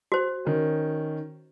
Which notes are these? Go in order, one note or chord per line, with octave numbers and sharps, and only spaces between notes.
F#4 C5
D#3 C#4